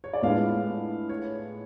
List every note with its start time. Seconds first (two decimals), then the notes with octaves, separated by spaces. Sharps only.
0.04 C#5
0.13 D5
0.22 A2 G#3 B3 D4 F4 F5
1.09 C#5